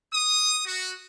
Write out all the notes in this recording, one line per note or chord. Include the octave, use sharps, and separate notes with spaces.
D#6
F#4